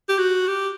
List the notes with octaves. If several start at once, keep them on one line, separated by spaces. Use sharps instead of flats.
G4
F#4
G4